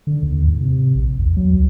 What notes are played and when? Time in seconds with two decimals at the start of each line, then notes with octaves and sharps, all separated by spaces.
0.07 D3
0.23 D#2
0.46 G#2
0.61 C3
0.95 A#1
1.19 E2
1.37 F#3
1.53 C#2